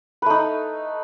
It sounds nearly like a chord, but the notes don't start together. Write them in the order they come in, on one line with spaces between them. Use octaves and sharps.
B4 A3 D#4